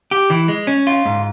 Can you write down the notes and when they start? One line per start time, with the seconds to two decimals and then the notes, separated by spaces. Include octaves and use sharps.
0.11 G4
0.30 E3
0.48 G#3
0.67 C#4
0.87 F4
1.05 G#2